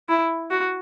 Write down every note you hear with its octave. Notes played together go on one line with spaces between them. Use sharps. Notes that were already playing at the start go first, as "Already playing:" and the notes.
E4
F#4